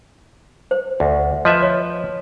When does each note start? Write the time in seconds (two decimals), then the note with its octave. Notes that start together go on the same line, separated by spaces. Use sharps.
0.71 C5
1.00 D2
1.45 F3 B4 D#5 E5
1.62 C#5